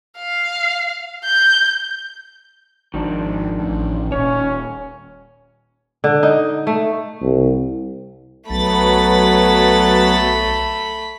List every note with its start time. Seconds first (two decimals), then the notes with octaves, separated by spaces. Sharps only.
0.18 F5
1.25 G6
2.94 G#1 D#3 F3 D4
3.59 A1
4.12 D#1 C#4 C#5
6.04 D3
6.23 D#4
6.67 A3
7.22 C2
8.50 B1 F#3 A3 B3 B5 A6